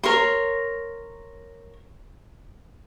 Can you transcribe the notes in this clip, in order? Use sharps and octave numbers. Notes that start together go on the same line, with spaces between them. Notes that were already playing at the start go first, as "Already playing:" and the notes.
A#4 C#5 C6